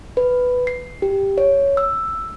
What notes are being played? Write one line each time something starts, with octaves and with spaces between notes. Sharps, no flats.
B4
C7
G4
C#5
E6